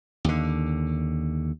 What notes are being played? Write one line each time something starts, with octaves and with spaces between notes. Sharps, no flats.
D#2 D3